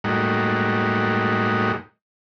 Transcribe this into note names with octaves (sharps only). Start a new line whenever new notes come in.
A2 G3 G#3 A#3 D#4 F#4